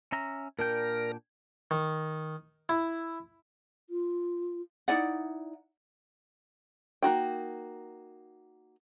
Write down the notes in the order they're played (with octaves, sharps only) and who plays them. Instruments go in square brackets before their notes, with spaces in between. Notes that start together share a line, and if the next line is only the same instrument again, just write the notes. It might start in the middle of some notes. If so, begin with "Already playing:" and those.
[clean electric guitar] C#4 E5 A#5
[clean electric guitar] A#2 D4 G5 [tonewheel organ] A#4
[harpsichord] D#3
E4
[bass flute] F4
[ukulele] D#4 E4 D5 F#5
[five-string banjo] A#3 D#4 F#4 G5